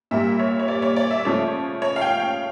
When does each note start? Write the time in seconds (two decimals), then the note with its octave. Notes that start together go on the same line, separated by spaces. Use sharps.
0.11 A#2 G3 A#3 E5
0.39 C#5
0.59 C#5
0.68 D5
0.82 C#5
0.96 D5
1.11 E5
1.25 C#3 F3 A3 C#5
1.82 C#5
1.96 F5
2.01 G5
2.19 G5